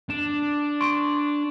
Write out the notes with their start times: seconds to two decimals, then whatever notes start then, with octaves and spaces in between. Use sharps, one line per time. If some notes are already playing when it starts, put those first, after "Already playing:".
0.10 D4 E7
0.81 C6 C#6 D7